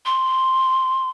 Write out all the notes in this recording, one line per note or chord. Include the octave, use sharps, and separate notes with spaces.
C6